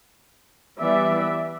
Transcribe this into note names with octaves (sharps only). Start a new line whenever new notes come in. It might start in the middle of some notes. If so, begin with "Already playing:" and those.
E3 G3 B3 D5 E5